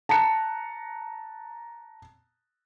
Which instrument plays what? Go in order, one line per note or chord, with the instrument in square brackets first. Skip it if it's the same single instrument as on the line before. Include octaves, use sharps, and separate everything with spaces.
[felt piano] A5 A#5 F#6 C#7